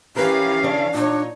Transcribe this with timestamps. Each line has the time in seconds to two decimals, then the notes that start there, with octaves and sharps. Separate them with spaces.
0.16 E3 C#4 G4 A#4 B4 F5
0.63 C#3 D4
0.94 A#2 D4 D#4 C#5